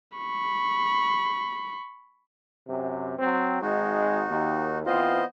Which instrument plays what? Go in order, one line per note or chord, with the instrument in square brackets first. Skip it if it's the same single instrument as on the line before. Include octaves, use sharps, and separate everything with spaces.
[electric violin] B5 C#6
[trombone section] F#2 C3
F#3 C4
[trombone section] G#1 G#3 [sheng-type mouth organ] D#4 F#4
[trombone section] D#2
[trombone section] E3 C4 F4 [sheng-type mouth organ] B3 C5 D#5